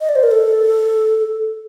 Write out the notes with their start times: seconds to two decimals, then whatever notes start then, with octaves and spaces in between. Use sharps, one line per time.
0.01 D#5
0.09 D5
0.16 C5
0.23 A#4
0.31 A4